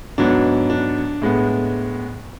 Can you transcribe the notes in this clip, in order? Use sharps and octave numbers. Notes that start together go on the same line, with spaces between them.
G#2 F#3 B3 D4
D4
A2 G#3 B3